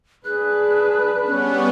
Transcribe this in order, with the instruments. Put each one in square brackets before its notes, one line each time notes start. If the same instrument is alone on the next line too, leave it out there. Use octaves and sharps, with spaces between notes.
[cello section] D4 B4 [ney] G#4 [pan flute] F#6
[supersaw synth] G3 B3 [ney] C#4 [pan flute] F#6